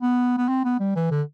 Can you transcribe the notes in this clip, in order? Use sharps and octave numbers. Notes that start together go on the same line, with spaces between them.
B3
B3
C4
B3
G3
E3
D3